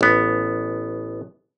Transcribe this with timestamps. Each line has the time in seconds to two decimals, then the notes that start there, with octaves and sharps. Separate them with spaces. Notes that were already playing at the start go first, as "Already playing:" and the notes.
0.01 A1 B3